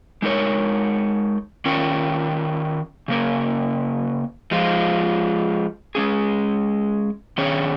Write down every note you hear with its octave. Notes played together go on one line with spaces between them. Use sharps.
G#3 D#4 A#4 C#5
D#3 C#4 F4 A#4
C#3 A#3 C#4 A#4
F3 G#3 F4
G#3 C#4 G#4
D#3 C#4 G#4 C#5